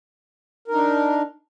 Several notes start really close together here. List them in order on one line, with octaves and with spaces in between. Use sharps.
A#4 D#4 D4